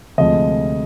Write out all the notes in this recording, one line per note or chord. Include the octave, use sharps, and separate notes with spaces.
D2 C3 F3 G#3 D#5